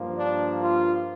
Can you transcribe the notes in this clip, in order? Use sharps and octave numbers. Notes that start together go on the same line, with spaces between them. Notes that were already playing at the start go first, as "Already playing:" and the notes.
Already playing: G2 F3 A#3
D4
F4